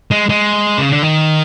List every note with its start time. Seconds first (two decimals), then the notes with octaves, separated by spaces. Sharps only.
0.11 G#3
0.29 G#3
0.78 C#3
0.90 D3
1.03 D#3